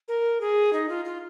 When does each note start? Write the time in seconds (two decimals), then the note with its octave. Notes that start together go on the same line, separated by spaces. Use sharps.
0.08 A#4
0.41 G#4
0.73 D#4
0.89 F4
1.05 F4